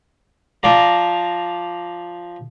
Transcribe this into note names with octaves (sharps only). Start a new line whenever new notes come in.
F3 D5 A#5